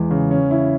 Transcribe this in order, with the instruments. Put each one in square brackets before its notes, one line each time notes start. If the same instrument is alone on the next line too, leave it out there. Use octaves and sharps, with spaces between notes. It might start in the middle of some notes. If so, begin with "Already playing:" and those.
Already playing: [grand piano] E2 E3 G#3
C#3
C#4
E4